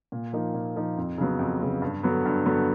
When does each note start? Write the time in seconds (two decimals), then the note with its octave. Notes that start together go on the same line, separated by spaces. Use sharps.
0.12 A#2
0.33 F3 A#3 D#4
0.54 A#2
0.76 F3 A#3 D#4
0.97 F2
1.18 C#3 F#3 B3
1.39 F2
1.61 C#3 F#3 B3
1.82 G2
2.03 D3 F#3 B3
2.25 G2
2.46 D3 F#3 B3